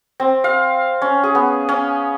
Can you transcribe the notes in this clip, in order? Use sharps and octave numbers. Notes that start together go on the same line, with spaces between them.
C4
F5
C#4
G#4
B3
C#4